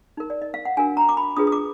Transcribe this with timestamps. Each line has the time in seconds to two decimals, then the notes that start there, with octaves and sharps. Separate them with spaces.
0.17 D#4 A#4
0.30 D5
0.42 D#5
0.54 F5
0.65 F#5
0.77 D4 F#4 A#4 G#5
0.97 A#5
1.09 D6
1.17 B5
1.37 D4 F4 G#4 B4 D#6
1.47 D#6
1.52 D6